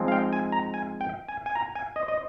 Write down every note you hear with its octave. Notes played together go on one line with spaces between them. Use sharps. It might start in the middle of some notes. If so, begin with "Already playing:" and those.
Already playing: F3 G#3 C4 D#4
F5
G5
G#5
A#5
G#5
G5
G#5
G#5
A#5
G#5
D#5
D#5